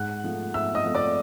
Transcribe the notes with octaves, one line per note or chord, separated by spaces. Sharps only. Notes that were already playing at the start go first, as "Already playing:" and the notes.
Already playing: G#2 F#5 F#6
F3 A3
G#2 E5 E6
D#5 D#6
F3 A3
D5 D6